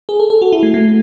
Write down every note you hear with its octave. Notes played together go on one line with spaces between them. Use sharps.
G#4
A4
A4
F#4
E4
A3
A3